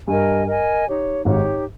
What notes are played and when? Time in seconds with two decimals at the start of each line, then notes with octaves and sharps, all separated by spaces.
0.07 G2 A#4 D#5 G#5
0.47 A#4 D#5 G#5
0.87 D#4 G4 C#5
1.25 G#1 G#2 D#4 G4 C#5